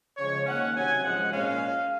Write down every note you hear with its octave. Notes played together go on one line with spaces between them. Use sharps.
C#3 F3 G#3 C#5
D#3 A#3 C#4 F#5
C3 F#3 C#4 G#5
G#2 F3 G#3 F#5
A#2 G#3 C#4 F5